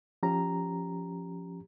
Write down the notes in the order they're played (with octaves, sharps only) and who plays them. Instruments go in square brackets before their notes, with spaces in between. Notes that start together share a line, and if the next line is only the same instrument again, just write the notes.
[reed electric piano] F3 C#4 G4 A#5